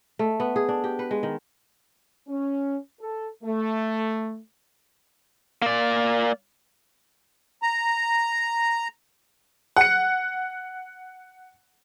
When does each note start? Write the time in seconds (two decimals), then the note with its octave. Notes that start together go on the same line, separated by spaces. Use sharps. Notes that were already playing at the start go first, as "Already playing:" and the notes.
0.19 A3
0.40 B3
0.56 G#4
0.69 D4
0.84 G4
0.99 B4
1.11 G#3
1.23 D#3
2.28 C#4
3.00 A4
3.44 A3
5.62 A#3 D5
7.63 A#5
9.76 F#5 C#7